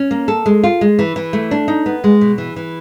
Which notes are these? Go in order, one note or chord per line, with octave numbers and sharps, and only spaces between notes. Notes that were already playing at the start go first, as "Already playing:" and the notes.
Already playing: C#4
A#3
A4
G#3
F4
G#3
E3
E3
A3
D4
D#4
B3
G#3
B2
E3
E3